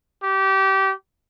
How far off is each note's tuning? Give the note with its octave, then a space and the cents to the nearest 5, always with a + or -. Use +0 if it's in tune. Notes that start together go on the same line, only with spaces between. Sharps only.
G4 -25